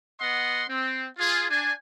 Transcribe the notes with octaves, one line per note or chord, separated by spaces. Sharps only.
B3 D#5 F#5 C6
C4
F4 G#4
D4 G#5